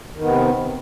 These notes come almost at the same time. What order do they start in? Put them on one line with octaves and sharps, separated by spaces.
D#3 B3 C3